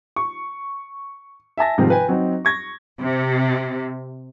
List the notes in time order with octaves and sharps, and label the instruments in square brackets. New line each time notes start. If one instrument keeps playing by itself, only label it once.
[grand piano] C#6
E5 G#5 A5 A#6
G#2 C3 D#3 F3 G#3
B4 G5 G#5
F#3 C4 D#4
C#6 G#6 A#6
[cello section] C3